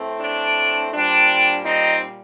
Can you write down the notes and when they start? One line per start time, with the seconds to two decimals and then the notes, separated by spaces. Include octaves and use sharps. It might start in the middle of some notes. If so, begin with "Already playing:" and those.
Already playing: A2 A3 C4
0.19 D4
0.92 A#2 G3 C4 D4
1.64 C4 D#4